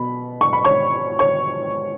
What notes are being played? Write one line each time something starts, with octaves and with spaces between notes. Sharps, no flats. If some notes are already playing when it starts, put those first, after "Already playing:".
Already playing: B2 B5
C#6
B5
C#5 C#6
C#5 C#6